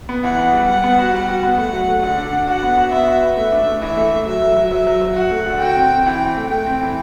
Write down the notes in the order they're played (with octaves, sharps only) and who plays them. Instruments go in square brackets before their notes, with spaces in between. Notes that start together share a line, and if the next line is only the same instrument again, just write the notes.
[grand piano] B3
[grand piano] E3 [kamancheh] F#5
[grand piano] B3
G3
[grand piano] G3 [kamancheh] F#5
[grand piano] B3
F#4
[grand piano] G3 [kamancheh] F#5
[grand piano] F#4
B3
[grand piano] A3 [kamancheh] F#5
[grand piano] F#3
A3
[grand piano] D3 [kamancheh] F#5
[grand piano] D4
D4
[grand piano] F#4 [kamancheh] F#5
[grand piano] B3
F#4
[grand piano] B3 [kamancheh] E5
[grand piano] F#4
B4
[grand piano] A3 [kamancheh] E5
[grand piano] D4
A3
[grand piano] E3 [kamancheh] E5
[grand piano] A3
A3
[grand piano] F#3 [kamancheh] E5
[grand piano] F#3
F#3
[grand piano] F#3 [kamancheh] E5
[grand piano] F#3
F#3
[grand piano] F#4 [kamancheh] F#5
[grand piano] A3
D3
[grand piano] F#4 [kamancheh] G5
[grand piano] C4
C4
[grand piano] E3 [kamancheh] G5
[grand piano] C4
A3
[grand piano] A3 [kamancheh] G5
[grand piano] C4
E3